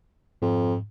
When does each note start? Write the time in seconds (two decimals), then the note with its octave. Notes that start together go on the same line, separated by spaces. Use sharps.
0.42 F2 G#2